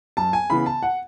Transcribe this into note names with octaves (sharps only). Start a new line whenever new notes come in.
F#2 A5
G#5
C#3 E3 B3 B5
A5
F#5